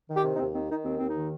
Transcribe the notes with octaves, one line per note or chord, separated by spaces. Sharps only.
D#3
G4
C3
D#4
D#2 C4
D#3 C4
D#3 D#4
D#2 C4
D#2 C4
D#4
D#3